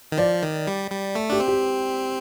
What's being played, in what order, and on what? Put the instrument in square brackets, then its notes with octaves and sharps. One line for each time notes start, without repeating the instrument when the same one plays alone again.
[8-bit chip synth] D#3
[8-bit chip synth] F3 [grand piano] D5
[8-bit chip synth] D#3
G3
G3
A3
[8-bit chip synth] D4 [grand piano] G4
[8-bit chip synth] C4
[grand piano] G4